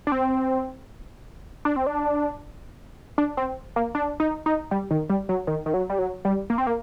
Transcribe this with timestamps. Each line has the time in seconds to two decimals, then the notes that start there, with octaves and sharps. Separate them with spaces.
0.07 D4
0.12 C4
1.65 D4
1.76 C4
1.87 D4
3.18 D4
3.37 C4
3.76 A#3
3.95 D4
4.20 D#4
4.46 D#4
4.71 G3
4.91 D#3
5.10 G3
5.29 F#3
5.47 D#3
5.66 D#3
5.74 F#3
5.90 G3
5.99 F#3
6.25 G3
6.50 A#3
6.58 C4
6.67 A#3